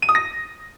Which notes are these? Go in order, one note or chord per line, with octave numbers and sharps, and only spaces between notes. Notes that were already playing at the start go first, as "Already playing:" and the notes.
D#7
D#6
A#6